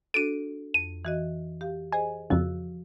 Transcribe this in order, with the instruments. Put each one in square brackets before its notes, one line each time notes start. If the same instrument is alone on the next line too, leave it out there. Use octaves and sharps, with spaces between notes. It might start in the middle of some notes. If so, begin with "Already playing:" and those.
[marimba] D4 F#4 A4 [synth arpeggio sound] D7 D#7
[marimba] F2 [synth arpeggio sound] D#7
[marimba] E3 F#4 D#5
G4 F5
[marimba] G#4 C5 D#5 [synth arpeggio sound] G#5
[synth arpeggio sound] F2 C#3 [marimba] F3 F#4 E6